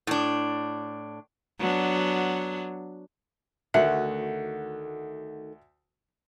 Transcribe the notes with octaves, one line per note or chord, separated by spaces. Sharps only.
A2 D4
F#3 B3 D4
D2 D#3 A3 F#4 E5 F#5